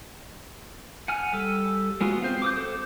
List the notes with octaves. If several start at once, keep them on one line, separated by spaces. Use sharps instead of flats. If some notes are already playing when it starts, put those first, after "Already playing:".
F#5 G#5 F6
G3 A4
G#3 B3 F4 F#4
C4 C5 F5
D6 D#6 G6
A4 C5